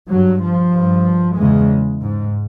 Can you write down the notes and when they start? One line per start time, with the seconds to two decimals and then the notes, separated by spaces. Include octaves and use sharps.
0.10 G2 F#3
0.42 F3
0.75 G2
1.38 E2 C#3 G#3
2.02 G#2